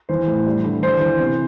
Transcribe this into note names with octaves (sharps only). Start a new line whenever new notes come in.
E3 C5
A2
G3
D3
E3 C5
E3
C3